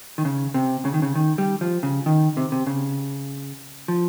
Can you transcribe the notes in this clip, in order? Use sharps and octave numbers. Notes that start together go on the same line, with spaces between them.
D#3
C#3
C3
C#3
D#3
C#3
D#3
G3
F3
C#3
D#3
C3
C3
C#3
F3